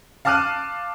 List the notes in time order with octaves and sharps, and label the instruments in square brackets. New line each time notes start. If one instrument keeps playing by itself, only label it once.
[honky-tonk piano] F5 A5 D6 F6 F#6 D#7